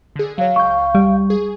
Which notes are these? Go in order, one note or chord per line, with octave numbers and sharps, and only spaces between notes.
D3 G#4
F#3 C#5 F5
C#2 G5 C#6 G6
G3
G#4